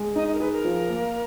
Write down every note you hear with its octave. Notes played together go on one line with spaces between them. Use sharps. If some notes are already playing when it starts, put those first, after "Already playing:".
Already playing: G#3
D#4 D#5
D#5
A#4
G#4 B4
A#4
F3
A#3